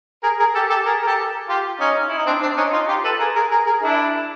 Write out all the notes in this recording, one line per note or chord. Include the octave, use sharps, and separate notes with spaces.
G#4 A#4
G#4 A#4
G4 A4
G4 A4
G#4 A#4
A#4
G4 A4
F4 G4
C#4 D#4
E4
D#4
C4 D4
C4 D4
C#4 D#4
D#4 F4
F4 G4
A4 B4
G#4 A#4
G#4 A#4
G#4 A#4
G#4 A#4
D4 E4